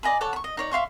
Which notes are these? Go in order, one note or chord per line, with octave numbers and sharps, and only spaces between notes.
D5 D#5 G#5 B5
A4 C#5 F#5 D6
B5 C#6
D#5
D#4 C#5 D5
E5 F5 C6 C#6